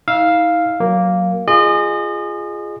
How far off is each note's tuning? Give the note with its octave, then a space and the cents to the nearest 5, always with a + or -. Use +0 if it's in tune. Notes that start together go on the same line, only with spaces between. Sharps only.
D#4 +45 F5 +0 E6 +0
F#3 +0 A#3 +0
F4 -10 G#4 +0 D#5 -35